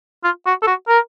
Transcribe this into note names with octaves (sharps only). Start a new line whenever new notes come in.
F4
F#4
A4
F#4
A#4